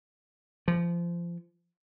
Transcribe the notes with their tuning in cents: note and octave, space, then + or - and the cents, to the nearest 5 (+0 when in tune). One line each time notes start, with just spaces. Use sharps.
F3 -25